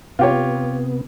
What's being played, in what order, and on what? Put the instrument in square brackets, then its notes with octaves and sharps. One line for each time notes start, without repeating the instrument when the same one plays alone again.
[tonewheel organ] C3 B3 [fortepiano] F4 G4 C#5